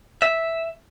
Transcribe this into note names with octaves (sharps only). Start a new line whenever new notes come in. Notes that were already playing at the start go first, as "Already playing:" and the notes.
E5